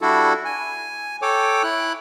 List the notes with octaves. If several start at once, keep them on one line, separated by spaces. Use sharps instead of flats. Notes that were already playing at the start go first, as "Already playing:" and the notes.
G3 D4 E4 F#4 A4
G#5
A4 C#5 G5 D6
E4 F#6